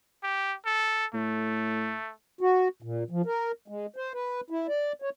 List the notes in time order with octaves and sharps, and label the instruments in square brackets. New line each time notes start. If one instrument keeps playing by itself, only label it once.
[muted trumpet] G4
A4
[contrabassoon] A2 [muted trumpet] A3
[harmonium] F#4
A#2
F3
A#4
G#3
C5
B4
E4
D5
C#5